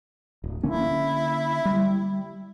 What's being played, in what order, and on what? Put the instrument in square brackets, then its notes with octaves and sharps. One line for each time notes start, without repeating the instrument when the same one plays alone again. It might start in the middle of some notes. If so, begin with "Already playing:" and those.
[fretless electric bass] D1
[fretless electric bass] D3 A#3 C#4 [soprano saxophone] E4
[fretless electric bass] G3